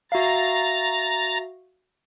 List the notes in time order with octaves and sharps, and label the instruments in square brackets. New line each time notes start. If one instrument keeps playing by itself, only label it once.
[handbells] F#4 E5 F5 [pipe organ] A#5 A6